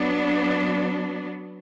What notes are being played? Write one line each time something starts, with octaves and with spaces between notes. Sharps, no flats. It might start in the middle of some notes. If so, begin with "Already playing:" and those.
Already playing: F#3 B3 D4